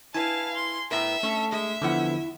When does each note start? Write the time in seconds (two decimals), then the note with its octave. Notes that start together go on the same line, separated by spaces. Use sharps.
0.14 E4 B4 F5 G#5 A5
0.56 C6
0.91 A2 B3 A#4 E5
1.23 A3 C#4 A4
1.52 G#3 E5
1.82 E2 D3 F3 B3 E4 F#5